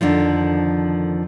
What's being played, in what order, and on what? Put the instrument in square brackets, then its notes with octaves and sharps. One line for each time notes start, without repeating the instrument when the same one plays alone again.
[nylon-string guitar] F2 D3 D#3 F3